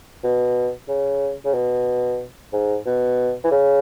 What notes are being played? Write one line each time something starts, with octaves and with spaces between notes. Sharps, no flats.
B2
C#3
C#3
B2
G#2
B2
E3
C#3